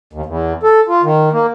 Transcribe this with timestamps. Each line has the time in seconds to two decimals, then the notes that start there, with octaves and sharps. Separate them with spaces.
0.13 D#2
0.26 E2
0.63 A4
0.88 F4
1.03 D#3
1.33 A#3